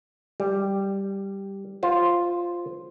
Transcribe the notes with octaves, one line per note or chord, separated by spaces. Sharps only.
G3
F4 C5